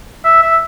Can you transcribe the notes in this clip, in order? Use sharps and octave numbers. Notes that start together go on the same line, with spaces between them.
E5
E5